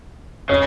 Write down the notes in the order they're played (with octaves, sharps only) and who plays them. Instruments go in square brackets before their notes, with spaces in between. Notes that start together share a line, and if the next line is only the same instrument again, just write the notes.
[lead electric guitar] C#3 [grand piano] C#5